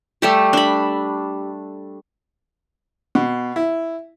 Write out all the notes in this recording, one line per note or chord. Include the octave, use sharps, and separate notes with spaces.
G3 A3 G4
D4 B5
B2
E4